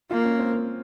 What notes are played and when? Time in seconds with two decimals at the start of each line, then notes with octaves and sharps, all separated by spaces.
0.11 A#3 F4
0.25 C#4
0.39 C4
0.53 C4